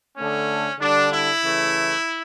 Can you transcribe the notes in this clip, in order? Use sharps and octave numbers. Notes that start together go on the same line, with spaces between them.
D3 A3 C#4
D3 G3 D4
E4
C#3 E3 A3